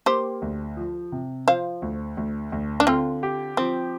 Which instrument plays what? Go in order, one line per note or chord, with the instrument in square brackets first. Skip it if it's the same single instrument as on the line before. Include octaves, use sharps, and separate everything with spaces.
[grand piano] A#3 [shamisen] G4 C5
[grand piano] D2
F3
C3
[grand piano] F3 [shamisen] C5 F5
[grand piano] D2
D2
D2
[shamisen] D4
[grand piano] D3 [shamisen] C4 F4
[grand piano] G4
[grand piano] F3 [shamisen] C4